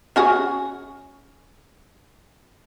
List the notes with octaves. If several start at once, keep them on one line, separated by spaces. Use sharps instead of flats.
C#4 F#4 G#4